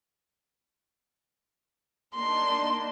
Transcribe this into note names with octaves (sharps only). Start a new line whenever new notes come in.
A#3 D4 D#4 C6